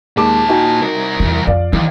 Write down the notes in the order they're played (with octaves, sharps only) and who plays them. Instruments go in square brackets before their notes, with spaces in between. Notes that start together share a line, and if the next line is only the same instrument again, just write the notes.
[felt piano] D#2 G#3 D6 [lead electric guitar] A#2 A5
[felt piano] D#4 F#4 G#5
[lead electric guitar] C2 A#4
[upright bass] E2 E3
[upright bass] F2 [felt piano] D5 F5
[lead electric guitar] D#2 [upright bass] E3